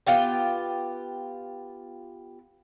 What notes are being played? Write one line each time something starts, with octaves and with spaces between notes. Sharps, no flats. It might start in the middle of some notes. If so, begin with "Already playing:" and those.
B3 F4 G4 G5